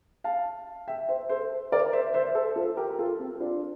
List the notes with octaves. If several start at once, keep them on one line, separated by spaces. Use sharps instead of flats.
F5 A5
E5 G5
C5 E5
A4 C5
A#4 D5
C5 E5
C5 E5
A4 C5
F4 A4
G4 A#4
F4 A4
C4
D4 F4